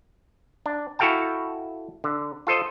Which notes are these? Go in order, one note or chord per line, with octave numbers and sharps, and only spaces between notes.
D4
E4 F#4 A4 F5 G5 A5
D3
F4 A4 C5 D#5